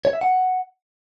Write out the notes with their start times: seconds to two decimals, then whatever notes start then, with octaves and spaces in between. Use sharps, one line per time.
0.05 C#5
0.13 E5
0.21 F#5